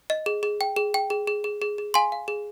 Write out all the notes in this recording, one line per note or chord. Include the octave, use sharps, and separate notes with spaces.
D#5
G#4
G#4
G5
G#4
G5
G#4
G#4
G#4
G#4
G#4
F5 G#5 C6
F5
G#4